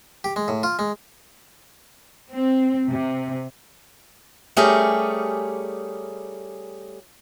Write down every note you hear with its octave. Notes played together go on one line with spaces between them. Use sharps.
G4
G#3
A2
F4
G#3
C4
C3
G3 A3 C#4 G4 G#4 A#4